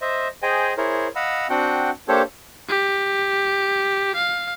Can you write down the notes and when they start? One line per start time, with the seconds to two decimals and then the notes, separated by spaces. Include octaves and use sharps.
0.02 C5 D#5 E5
0.42 G#4 C5 D#5 G5 G#5
0.77 E4 G#4 A#4 C5 C#5
1.15 D#5 F5 F#5 B5 E6
1.50 C4 D4 F#4 F#5 G5
2.08 A#3 D4 G4 A4 C5 C#5
2.69 G4
4.16 F5